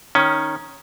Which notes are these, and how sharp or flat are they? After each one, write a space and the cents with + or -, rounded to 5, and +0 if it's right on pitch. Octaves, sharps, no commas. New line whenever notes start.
D#3 +0 C#4 +0